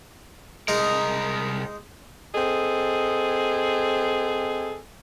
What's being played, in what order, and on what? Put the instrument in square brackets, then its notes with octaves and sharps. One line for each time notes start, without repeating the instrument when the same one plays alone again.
[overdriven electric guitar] C2 A#4 [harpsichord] G#3 D#4
[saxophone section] C4 G#4 A4 D#5